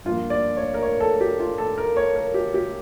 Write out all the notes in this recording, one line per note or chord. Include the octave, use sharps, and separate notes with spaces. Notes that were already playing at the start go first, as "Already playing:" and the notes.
G2 F3 A#3 F4
D5
C#5
A#4
C#5
A4
G4
F4
A4
A#4
C#5
A#4
G4
G4